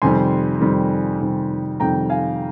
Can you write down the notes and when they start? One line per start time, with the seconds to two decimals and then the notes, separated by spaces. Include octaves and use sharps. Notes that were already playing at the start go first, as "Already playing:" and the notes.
0.02 F2 C3 D#3 G3 G#5 C6
0.61 F2 C3 D#3 G3
1.21 F2 C3 D#3 G3
1.80 F2 C3 D#3 G3 G5 A#5
2.10 F5 G#5